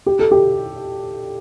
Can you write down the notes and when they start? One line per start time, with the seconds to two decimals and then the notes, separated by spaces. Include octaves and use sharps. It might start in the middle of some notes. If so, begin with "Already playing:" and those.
0.06 G4
0.19 A4
0.31 G4